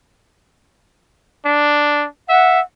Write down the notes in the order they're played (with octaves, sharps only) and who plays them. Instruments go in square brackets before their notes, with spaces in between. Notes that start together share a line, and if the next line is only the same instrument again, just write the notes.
[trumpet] D4
[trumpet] E5 [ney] F#5